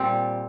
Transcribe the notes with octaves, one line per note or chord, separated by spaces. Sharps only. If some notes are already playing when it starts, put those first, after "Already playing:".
Already playing: A#2 G3 C4